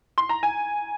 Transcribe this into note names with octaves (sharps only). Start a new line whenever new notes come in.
C6
A#5
G#5